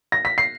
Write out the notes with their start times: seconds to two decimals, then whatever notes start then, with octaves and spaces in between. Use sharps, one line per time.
0.12 A#6
0.25 B6
0.38 C7